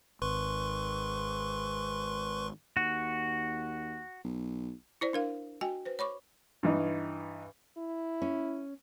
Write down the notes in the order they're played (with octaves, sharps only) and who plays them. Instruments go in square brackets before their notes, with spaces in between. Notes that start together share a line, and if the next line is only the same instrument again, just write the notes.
[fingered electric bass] G#1 [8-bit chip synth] B4 C6 C#6
[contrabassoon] D#2 [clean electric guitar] F#4
[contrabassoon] B1
[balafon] E4 C5 D5
D4 A#4 F5
F#4 D#5 G5 G#5
B4 C5
C#5 B5 C#6 D6
[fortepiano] G2 E3 D#4
[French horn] E4
[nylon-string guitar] C#4